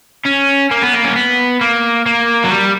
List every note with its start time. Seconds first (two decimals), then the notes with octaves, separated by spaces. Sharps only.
0.26 C#4
0.71 A#3
0.82 B3
0.93 A#3
1.04 C#4
1.16 B3
1.61 A#3
2.06 A#3
2.45 F#3
2.51 G3